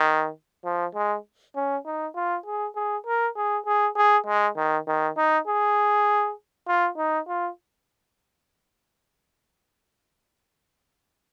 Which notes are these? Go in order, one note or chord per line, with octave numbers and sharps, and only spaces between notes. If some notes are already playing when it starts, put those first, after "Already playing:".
Already playing: D#3
F3
G#3
C#4
D#4
F4
G#4
G#4
A#4
G#4
G#4
G#4
G#3
D#3
D#3
D#4
G#4
F4
D#4
F4